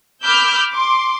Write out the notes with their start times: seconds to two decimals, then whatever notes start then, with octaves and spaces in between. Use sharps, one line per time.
0.24 B5 D6 E6 F6 G6
0.70 C6 D6